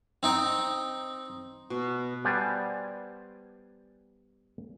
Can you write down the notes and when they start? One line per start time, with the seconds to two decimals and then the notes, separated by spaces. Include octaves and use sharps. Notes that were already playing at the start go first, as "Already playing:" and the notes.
0.23 C4 D#4 G5
1.70 B2
2.25 G3 B3 C5 D5 G#5 A5